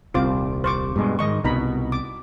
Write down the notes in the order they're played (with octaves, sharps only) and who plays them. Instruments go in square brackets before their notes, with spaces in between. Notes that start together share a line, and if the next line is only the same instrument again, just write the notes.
[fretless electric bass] D#1 C2 C4 [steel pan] F4 C5 D6
[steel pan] C5 C#6 D6
[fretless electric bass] G2 B2 G#3
[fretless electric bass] G#2 D#3 G#3 [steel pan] D#5 C#6
[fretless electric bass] C2 B2 [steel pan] D#4 A#5 B5
[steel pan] D6